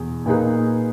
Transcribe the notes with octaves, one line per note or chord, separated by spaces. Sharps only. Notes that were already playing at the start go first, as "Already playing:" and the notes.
Already playing: E2 B2
A#2 A#3 D#4 G#4 B4